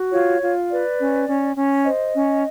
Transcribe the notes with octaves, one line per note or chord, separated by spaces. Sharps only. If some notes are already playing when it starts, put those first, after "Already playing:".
Already playing: F#4
F4 C#5
F4
B4 D5
C#4
C#4
C#4
C5 D#5
C#4